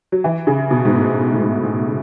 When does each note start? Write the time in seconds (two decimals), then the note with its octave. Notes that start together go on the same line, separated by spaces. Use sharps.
0.12 F#3
0.24 E3
0.47 C#3
0.71 B2
0.85 G#2
0.94 A2
1.34 A2
1.41 G#2
1.63 A2
1.87 C#3